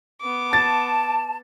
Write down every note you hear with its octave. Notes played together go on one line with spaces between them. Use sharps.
B3 D6
A5 A6